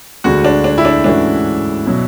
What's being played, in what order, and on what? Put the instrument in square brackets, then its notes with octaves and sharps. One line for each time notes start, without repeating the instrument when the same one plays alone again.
[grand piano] D2 D3 G#3 [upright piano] F#4
[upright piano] D4
D4
E4
D4
[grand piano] G#2 E3 A3 C#4 F#4 [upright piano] D4
[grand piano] B2 F#3